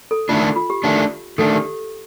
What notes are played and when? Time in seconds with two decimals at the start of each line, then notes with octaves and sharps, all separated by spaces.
0.11 A4
0.29 D#3 A3 D4 F4
0.56 F4
0.70 G4
0.84 D#3 A3 D4
1.38 D#3 A3 D4 A4
1.56 G4